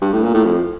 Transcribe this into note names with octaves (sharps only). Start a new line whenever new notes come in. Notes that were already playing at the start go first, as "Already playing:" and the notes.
G2
A2
A#2
A2
F2